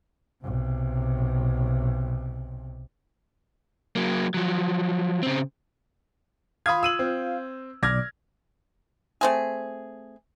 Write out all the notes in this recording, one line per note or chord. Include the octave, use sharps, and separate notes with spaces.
B1 C3
F#3 A#3
F3 F#3
C#3 C4
F4 F5 B5 D#6 G#6
E6 D#7 F#7
C4
B1 D5 F6 G#6 A#6
A3 C4 G#4